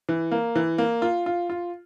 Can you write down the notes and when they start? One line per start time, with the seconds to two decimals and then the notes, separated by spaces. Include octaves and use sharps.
0.09 E3
0.31 A#3
0.56 E3
0.78 A#3
1.02 F4
1.26 F4
1.50 F4